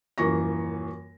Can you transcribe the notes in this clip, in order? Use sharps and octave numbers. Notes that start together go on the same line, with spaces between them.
D#1 F#2 E3 A#3 C#6 A#6